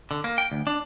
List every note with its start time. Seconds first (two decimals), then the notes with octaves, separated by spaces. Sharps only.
0.11 D3
0.24 A#3
0.38 G5
0.52 D2
0.67 D4